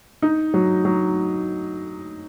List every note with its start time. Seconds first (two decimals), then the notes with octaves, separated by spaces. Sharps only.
0.22 D#4
0.54 F#3
0.85 F#3